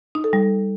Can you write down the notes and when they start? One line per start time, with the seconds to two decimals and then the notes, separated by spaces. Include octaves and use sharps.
0.15 D#4
0.24 A4
0.33 G3